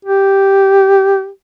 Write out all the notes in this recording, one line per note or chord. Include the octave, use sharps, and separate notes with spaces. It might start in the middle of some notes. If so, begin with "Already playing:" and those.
G4